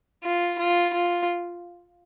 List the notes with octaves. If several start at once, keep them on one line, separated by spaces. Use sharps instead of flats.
F4
F4
F4